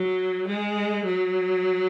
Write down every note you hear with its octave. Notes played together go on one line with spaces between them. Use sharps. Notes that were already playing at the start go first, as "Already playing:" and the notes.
Already playing: F#3
G#3
F#3